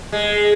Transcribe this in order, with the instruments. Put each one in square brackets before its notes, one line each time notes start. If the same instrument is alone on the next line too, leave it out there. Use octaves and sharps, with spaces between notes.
[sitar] G#3